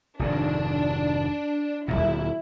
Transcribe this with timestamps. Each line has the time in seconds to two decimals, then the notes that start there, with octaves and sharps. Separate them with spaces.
0.19 F1 G#2 D#3 D4
1.88 D1 G#1 A#2 E4